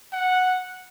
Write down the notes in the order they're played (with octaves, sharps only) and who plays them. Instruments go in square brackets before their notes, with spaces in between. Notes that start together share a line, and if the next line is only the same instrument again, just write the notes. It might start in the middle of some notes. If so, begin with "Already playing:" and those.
[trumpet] F#5